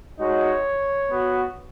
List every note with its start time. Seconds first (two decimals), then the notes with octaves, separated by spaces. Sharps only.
0.19 G#3 D#4 F#4 C#5
1.09 B3 F#4